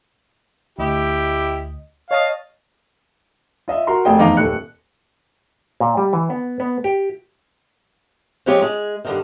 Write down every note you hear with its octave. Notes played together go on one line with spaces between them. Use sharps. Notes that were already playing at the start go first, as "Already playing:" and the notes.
D2 E4 G4 D#5
C#5 D#5 F5 A5 D#6
F4 D#5 E5
F#4 A#4 A#5 C6
F1 G#4 D#5 G5
E2 F3 D#4 F5 D6
D#1 A4 F#6 C#7
A#2
G3
E3
B3
B3
G4
F3 G#3 C#4 F4 G4
G#3 G#4
G2 D3 D#3